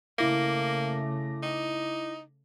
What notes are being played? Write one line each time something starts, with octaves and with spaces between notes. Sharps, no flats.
C#3 A3 A#3 E4 D6 A#6
D#4